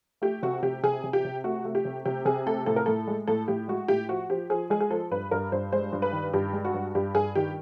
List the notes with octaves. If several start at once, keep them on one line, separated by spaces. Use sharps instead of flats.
A3 G4
C3 F#4
C3 G4
C3 G#4
C3
G4
C3
A3 F#4
A3
G4
C3
C3 G4
C3 G#4
A3 A4
A2 A4
A#4
A2 A4
G#3
A2 A4
A2 G4
G#3 F#4
A2 G4
F3 F#4
F3 G4
F3 G#4
G#3 G#4
G#4
F3 A4
G2 B4
G2 A#4
G2 C5
G#3 C5
G2
B4
D#3
G2 G4
G#3
F#4
G2
G2 G4
G2 G#4
D#3 G4